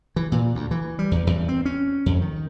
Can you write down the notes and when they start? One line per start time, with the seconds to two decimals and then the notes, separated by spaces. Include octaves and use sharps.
0.16 E3
0.32 A#2
0.55 D2
0.71 E3
0.99 G3
1.11 E2
1.27 E2
1.48 C4
1.65 C#4
2.06 F2
2.21 D#3